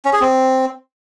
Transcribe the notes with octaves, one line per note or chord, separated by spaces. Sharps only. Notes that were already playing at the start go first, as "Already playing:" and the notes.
C#4
G#4
C4